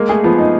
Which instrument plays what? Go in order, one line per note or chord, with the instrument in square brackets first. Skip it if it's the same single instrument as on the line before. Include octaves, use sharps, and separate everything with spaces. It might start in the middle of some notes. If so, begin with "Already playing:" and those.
Already playing: [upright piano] G#3 [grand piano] A#3
[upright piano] A3 [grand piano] G#4
[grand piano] F3 [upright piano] B3
[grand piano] D#4